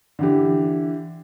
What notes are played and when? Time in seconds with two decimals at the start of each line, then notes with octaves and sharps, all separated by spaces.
0.19 D3 E3 G4